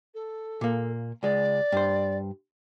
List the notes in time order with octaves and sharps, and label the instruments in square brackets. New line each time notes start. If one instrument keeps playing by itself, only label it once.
[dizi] A4
[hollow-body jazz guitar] A#2 A#3
[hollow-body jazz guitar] C#2 G#3 [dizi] D5
[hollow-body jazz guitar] G2 C5